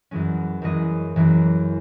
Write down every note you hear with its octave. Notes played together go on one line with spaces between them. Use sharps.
F#2 E3 G#3 C#4
F#2 E3 G#3 C#4 D#5
F#2 E3 G#3 C#4